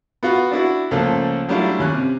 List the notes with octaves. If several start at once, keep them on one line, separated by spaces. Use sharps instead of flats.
B3 F4 F#4
D4 E4 F#4
C#2 F3 A3 A#3 A4
F#3 G3 A3 D4 E4 F4
D#2 C#4 F#6
C3